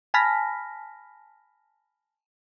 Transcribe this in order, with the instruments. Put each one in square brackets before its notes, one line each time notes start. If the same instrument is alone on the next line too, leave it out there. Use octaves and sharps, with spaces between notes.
[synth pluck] G#5 A5 B5 F6 A#6 B6